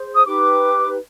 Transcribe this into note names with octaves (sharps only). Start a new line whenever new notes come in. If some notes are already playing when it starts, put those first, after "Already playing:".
Already playing: G#4 C5
D#6
D#4 G4 B4 D6